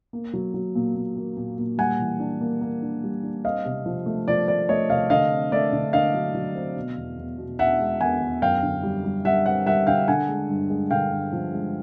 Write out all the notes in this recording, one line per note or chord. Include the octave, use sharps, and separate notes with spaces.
A#3
F#3
F#3
A#2
A#2
A#3
A#2
A#2
G3 F#5 G#5
E3
D4
A#3
A#3
D4
G3
D4
C4 D#5 F5
C3
F3
A3
F3 D5
A3 D5
A3 C#5 D#5
C3 D#5 F5
D3 D#5 F5
C4
A3 D5 E5
D3
D3 D#5 F5
F#3
F#3
C4
B2
E2
E2
B2
E2 E5 F#5
G#3
E2 F#5 G#5
E2
F#2 F5 G5
D3
G3
G3
G3 E5 F#5
C4 E5 F#5
G3 E5 F#5
D3 F5 G5
D3 F#5 G#5
G#3
G2
G#3
D3 F5 G5
G2
F3
G#3